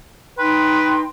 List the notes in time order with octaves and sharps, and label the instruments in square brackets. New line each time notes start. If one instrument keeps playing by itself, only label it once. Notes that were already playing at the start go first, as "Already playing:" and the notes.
[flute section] D#4 G5 C6 [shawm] B4